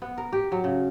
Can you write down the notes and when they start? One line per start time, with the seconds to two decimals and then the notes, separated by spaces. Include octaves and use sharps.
0.02 B3
0.18 A#4
0.33 G4
0.52 F#3
0.64 C#3